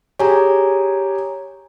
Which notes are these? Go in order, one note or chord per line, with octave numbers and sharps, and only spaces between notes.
G4 G#4 C#5 G#5 A#5